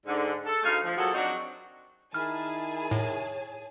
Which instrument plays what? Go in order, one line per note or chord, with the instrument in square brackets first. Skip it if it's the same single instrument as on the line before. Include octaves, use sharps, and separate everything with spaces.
[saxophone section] G#2 D3
A4
D2 A3 D#4 G#4 F5
F3
A#2 F#3 G#3 F#4 G#4 A4
F#3 C4 D4 D#4 F#4
[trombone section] D#3 E4 A#4 [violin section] G#4 G#5 A5 [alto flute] B5 [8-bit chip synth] F6
[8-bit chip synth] A2 [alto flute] C#5